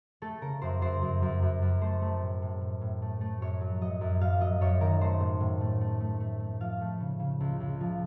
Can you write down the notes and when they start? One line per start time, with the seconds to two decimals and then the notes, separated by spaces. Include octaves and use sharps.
0.22 A3 A4
0.42 C#3 A#4
0.62 F#2 C5
0.81 F#2 C5
1.02 F#2
1.22 F#2
1.42 F#2
1.62 F#2
1.81 A3 C5
2.02 A3
2.21 A2
2.42 A2
2.61 A2
2.81 A2
3.02 A3
3.21 A3
3.41 F#2 C#5
3.61 F#3
3.81 F#3 D#5
4.01 F#2
4.21 F#2 F5
4.41 F#3 D#5
4.61 F#2 C#5
4.81 D#3 A#4
5.01 A3 C5
5.20 A2
5.40 A2
5.61 A3
5.81 A3
6.00 A3
6.20 A3
6.40 A3
6.60 F3 F5
6.81 A3
7.00 C#3
7.20 C#3
7.40 C#2
7.60 C#2
7.80 F3